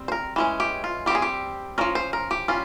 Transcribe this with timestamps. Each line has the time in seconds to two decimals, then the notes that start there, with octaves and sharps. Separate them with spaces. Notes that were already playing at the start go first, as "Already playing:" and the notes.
Already playing: G3 C4
0.08 C5
0.12 A#4
0.36 E3 G#3 C#4
0.60 G4
0.84 F4
1.06 G3 G4
1.10 C4 G#4
1.22 G4
1.78 F3 A#3 C#4 A#4
1.95 C5
2.13 A#4
2.31 G4
2.48 G3 C#4 F4